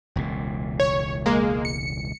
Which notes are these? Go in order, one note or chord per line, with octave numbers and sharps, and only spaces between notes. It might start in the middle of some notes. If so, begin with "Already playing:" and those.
E1 C#2 A#2
C#5
G#3 A#3
C#7